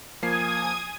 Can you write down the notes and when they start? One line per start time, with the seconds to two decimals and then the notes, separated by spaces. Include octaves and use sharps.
0.23 F3 A#3 G#5 D#6 G#6 C7